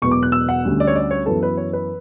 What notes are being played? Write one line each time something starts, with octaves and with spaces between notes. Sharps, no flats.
E1 E2 B2 F#3 B3 C#6
D6
F#6
E6
F#5
D2 D3 G3 C#4
D5
C#5
D5
C#5
F#2 E3 B3 A4
B4
C#5
B4